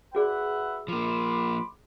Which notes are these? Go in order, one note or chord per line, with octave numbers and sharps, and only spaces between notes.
F#4 G#4 B4 D5 E5 F#5
F3 A#3 B5 C6 D6